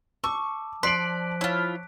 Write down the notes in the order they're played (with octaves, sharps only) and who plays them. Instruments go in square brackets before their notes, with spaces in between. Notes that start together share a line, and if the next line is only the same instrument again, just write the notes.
[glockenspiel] A5 D6 [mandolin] C#6 [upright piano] E6
[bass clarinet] F3 [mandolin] D5 [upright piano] C6 C7 F#7 [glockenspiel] F#6 B6 D7
[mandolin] E4 F4 [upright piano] C#5